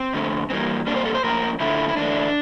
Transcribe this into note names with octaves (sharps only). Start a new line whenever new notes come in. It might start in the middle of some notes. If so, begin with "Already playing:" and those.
Already playing: C4
F2 D3 A3
G2 E3 G3 A#3 C4
F2 C3 G3 A#3 D4
C5
A4
C5
A2 F3 A#3 A#4
F2 D3 F3 A3 E4
E4
F2 E3 A3 D4